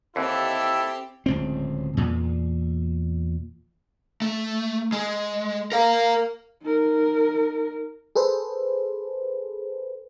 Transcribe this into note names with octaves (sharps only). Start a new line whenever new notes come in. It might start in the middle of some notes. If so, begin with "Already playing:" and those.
D#2 E3 C4 E4 G4 A4
D1 C#2 C4
E2 A#2
A3
G#3
A#4 F5
D#4 A#4
G#4 A4 B4 C5